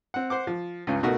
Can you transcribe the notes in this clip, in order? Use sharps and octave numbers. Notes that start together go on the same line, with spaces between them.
C4 F#5
C5 F#5 D6
F3
C#2 G2 C#4
B2 A3 D#4 F#4 A#4